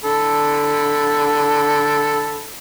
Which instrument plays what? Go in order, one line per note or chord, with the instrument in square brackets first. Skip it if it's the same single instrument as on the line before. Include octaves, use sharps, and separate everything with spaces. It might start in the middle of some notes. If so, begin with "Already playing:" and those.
[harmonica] D3 A4 B5